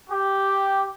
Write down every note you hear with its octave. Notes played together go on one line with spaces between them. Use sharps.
G4